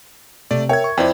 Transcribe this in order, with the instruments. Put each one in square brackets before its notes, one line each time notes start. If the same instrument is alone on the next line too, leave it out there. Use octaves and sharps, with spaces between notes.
[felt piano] C3 [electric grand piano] A3 D5
[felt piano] A#4 E5 G5 [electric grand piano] C#5 G#6
[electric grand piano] C#6
[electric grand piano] F2 E4 [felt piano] C5 D5 G5